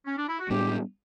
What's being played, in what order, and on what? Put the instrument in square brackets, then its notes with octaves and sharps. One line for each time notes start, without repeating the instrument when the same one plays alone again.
[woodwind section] C#4
D4
E4
F#4
[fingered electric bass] A2 G3 B3 D4 [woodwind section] G4